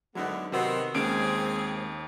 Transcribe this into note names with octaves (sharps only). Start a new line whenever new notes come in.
F#2 A2 D3 F#3 G#3 A3 B3 D#4
C3 D#3 B3 C4 F#4
D#2 G#3 C4 C#4 G#4 D7